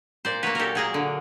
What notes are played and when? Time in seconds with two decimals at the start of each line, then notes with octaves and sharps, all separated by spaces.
0.25 A#2 C5 D5
0.43 F#3 A#3 B4 C#5
0.55 A#2 G4 A4 A#4
0.75 F#3 A#3 G#4 A#4
0.94 D3